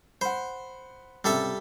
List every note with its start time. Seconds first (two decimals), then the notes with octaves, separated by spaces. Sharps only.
0.21 C5 F#5 B5
1.24 C#2 C3 G3 A4 E5